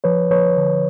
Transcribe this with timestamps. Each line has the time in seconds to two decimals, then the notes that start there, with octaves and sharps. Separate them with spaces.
0.04 F3 B4 C#5
0.31 F3 B4 C#5
0.57 D3